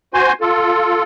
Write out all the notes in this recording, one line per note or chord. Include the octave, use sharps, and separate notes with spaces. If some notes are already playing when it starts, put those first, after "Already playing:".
F#4 C5 G#5 C6
F4 A4